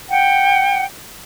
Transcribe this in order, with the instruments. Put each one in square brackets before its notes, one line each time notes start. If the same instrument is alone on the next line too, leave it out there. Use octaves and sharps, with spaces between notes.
[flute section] F#5 G5